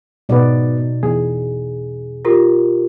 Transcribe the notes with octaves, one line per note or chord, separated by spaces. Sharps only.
G#2 B2 B3 D#4 D5
E2 G#4
F4 G4 A#4